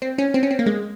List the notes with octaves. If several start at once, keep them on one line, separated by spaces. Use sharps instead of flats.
C4
C#4
C4
C#4
C4
A#3
G#3